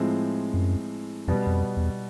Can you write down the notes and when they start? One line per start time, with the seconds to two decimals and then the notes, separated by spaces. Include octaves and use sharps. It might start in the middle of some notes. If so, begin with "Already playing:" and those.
Already playing: A2 F3 G#3 C4
0.54 F#2
1.28 F2 B2 G3 B3
1.47 F2
1.77 E2